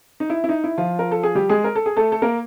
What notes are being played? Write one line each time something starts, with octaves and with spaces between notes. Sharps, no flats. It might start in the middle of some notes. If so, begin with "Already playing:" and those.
D#4
E4
E4
D#4
E4
F3 F4
A#4
A4
G#4
G3 G4
G#3 G#4
A#4
A4
G#4
A3 A4
A4
A#3 A#4